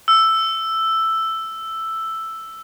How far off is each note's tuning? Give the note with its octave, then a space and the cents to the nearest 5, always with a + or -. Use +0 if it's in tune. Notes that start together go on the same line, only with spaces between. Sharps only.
E6 +5